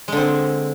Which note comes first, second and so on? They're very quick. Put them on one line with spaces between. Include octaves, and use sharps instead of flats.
G#3 D3 C4